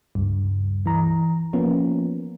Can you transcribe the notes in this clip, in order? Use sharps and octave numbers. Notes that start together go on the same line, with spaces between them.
C#2 G2
E3 A#5
F3 A#3 B3 C#4